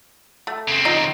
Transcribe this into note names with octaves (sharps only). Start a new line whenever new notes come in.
A3
C#3 C4
D#4 F4 D#5